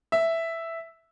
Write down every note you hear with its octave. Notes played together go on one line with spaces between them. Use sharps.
E5